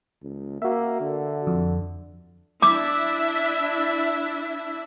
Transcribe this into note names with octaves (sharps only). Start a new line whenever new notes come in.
C#2
A#3 F#4 E5
D3
F2
D4 E4 E5 D6